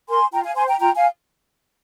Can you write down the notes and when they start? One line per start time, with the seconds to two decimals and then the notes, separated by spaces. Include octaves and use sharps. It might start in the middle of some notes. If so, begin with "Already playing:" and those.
0.09 A#4 G#5 C6
0.32 F4 G5 A#5
0.43 F5 G#5
0.56 C5 G#5 C6
0.67 G5 A#5
0.79 F4 G5 A#5
0.95 F5 G#5